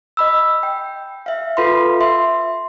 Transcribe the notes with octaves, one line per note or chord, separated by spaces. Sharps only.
D#5 B5 E6
G5
E5 F5
F4 A4 B4 F5 B5 C6
E5 C6